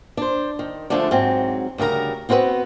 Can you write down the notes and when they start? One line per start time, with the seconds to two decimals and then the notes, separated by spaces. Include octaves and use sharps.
0.17 D4 C5
0.59 D#3
0.90 D3 F3 G#3 A3 D4
1.11 G#2 F#3 C4
1.78 D2 C#3 G3 A#4 A#5
2.29 B3 C4 F#4 A#4 B4